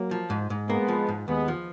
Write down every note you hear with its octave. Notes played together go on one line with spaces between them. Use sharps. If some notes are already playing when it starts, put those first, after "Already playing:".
Already playing: F#3 A#3
F3
G#2
G#2
G#3 A#3 B3
F3
G#2
D#2 G#3 B3
F3